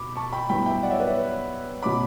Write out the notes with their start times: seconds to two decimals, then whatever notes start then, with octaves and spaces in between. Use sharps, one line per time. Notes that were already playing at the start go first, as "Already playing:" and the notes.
Already playing: B2 B5 D6
0.16 A5 C#6
0.33 G5 B5
0.49 G2 F#3 B3 E4 G5 B5
0.66 E5 G5
0.83 D5 F#5
0.91 C#5 E5
1.00 B4 D5
1.07 C#5 E5
1.83 B2 F#3 C#4 B5 D6